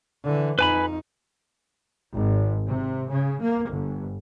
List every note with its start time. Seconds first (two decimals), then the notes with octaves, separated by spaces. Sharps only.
0.23 D3 E3
0.59 F2 D#4 B4 G#5 B5
2.15 G#1
2.67 C3
3.10 C#3
3.42 A#3
3.71 G1